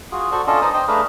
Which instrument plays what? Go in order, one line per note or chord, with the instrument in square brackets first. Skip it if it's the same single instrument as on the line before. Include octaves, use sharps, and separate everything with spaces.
[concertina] F4 F#4 G#4
F#4 A4 C5 D5 C#6
C#4 D4 F4 A4 D#5
B3 D#4 C5 D5 D#5 D#6
C5 D#5 G5
A3 D4 G#4 B4 F5 A#5